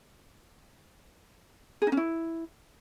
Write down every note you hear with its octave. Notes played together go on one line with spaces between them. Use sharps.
G#4
D#4
C#4
E4